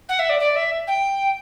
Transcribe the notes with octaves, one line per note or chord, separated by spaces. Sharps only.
F#5
E5
D5
D5
E5
G5